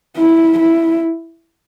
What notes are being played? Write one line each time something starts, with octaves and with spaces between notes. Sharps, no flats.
E4
E4